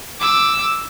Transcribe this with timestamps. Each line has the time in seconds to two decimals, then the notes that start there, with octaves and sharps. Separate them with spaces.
0.20 D6 E6